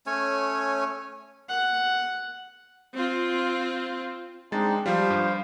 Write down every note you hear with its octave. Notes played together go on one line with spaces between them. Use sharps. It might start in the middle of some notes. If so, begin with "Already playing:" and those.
A3 C#4 C#5 G#5
F#5
C4 F4
G#3 C4 D4 D#4 A6
F3 G3 C5 F5
G2